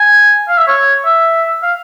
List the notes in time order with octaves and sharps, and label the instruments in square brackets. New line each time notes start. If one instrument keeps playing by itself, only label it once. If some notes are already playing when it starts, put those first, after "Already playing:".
Already playing: [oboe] G#5
F5
E5
C#5
E5
F5